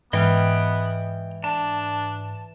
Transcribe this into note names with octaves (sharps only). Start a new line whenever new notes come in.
G#2 E3 B3 D#5 G5 F6
D4 A5